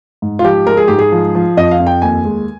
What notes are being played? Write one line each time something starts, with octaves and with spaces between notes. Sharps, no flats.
G#2
F4
F3 G4
G#3 A#4
G#4
G#2 G4
G#4
F3
F3
F2 D#5
F5
F2
G5
D#2 G#5
G#3